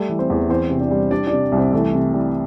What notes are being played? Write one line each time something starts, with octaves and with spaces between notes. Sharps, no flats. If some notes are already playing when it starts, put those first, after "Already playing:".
Already playing: G3 A3 A4
E3
C4 C5
E2
E3 C4 C5
C3
D4 D5
G3
G3 D4 D5
C3 D4 D5
C2
C4 C5
E3 A3 A4
C3
G3